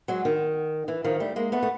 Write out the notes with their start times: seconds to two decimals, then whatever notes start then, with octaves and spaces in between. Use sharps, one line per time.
0.08 F#3 G#3
0.25 D#3
0.88 E3
1.04 D#3 F3
1.20 G3 A3
1.36 G#3 A#3
1.52 A3 B3
1.63 A3